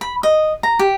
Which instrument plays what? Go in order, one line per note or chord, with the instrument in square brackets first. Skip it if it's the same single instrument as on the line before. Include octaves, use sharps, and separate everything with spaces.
[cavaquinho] B5
D#5
A#5
G4